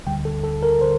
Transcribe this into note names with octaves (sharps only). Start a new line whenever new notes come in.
D2 D3 G3 G5
A4
A4
A#4
D3 C5